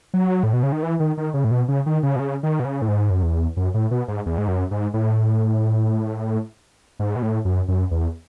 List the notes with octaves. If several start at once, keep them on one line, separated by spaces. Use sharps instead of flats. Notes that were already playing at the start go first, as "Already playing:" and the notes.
F#3
A2
B2
C#3
D#3
E3
D#3
D#3
C#3
A2
B2
C#3
D#3
C#3
B2
C#3
D#3
B2
C#3
A2
G#2
F#2
E2
F#2
A2
B2
G#2
E2
G#2
F#2
G#2
A2
G#2
B2
A2
F#2
F#2
E2